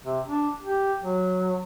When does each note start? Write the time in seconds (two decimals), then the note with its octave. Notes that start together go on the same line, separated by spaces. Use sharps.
0.05 C3
0.27 D4
0.63 G4
1.02 F#3